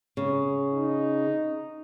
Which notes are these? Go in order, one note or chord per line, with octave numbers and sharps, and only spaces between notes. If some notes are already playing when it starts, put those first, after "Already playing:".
C#3
D#4